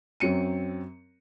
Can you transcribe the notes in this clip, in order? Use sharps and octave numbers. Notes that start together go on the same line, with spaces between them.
F#2 F#3 C4 C#7 D#7